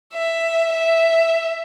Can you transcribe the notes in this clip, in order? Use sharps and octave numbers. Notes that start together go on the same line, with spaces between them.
E5
E5